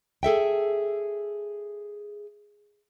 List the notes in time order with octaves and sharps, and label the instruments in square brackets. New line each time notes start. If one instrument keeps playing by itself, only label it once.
[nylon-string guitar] G#4 A4 E5 G5